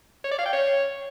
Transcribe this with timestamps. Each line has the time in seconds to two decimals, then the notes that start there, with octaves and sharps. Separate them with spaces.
0.24 C#5
0.31 D5
0.39 F5
0.46 G5
0.53 C#5